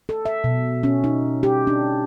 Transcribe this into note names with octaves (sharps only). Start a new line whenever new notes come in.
A4
E5
B2
C#4
D#4
G4
D4